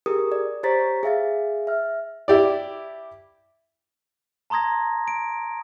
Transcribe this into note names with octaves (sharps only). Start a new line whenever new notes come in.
G4 G#4 A#4 D#6
D5
G4 C5 C#5 A#5 A6 B6
G#4 E5 F5 A6
E5 F6
E4 G4 D5
A5 A#5 C6 D#6 G#6 A#6
D7